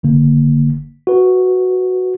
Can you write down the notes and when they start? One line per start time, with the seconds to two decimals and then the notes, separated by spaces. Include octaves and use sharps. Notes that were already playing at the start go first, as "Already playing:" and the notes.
0.03 G1 D3 A#3
1.07 F#4 B4